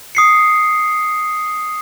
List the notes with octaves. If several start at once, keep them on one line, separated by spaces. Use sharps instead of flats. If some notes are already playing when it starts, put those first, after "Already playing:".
D#6 C7 C#7